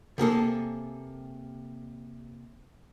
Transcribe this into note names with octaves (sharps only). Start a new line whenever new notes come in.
C3 A#3 G#4 A4